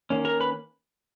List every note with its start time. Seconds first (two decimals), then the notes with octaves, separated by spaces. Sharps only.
0.10 D#3 A#3 C#4
0.25 A#4 A#5
0.40 B4 B5